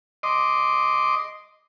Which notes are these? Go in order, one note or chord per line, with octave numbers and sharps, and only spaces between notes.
D#5 C6 D6